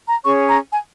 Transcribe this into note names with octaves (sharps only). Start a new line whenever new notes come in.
A#5
C#4 G#4 C#5 C#6
A#5
G#5